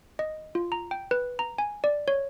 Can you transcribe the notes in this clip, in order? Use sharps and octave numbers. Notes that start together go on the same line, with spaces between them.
D#5
F4
A#5
G5
B4
A#5
G#5
D5
C#5